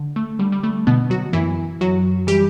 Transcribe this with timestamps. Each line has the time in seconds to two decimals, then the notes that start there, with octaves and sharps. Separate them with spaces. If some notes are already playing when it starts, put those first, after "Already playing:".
Already playing: D3
0.16 A3
0.39 D3 G3
0.52 G3
0.64 A3
0.87 B2 D3 B3
1.10 F#3 F#4
1.33 F#2 E3 E4
1.81 F#2 F#3 F#4
2.27 E3 G3 G4